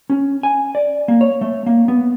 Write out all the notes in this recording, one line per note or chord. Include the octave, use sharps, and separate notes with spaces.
C#4
G#5
D5
A#3
C#5
A3
A#3
B3